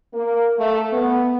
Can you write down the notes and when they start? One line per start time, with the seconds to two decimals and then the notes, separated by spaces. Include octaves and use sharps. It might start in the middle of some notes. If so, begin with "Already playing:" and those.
0.14 A#3
0.59 A3
0.93 B3